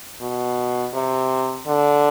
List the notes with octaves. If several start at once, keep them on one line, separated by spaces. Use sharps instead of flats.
B2
C3
D3